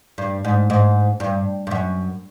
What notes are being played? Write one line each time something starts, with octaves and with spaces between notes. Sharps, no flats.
G2
G#2
G#2
G2
G2
F#2